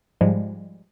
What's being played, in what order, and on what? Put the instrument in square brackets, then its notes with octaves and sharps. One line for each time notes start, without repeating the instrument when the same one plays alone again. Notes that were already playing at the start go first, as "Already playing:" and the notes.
[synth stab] G#2 F3 G3 G#3